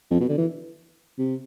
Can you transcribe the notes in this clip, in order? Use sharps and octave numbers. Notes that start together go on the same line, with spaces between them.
F2
B2
D3
E3
C3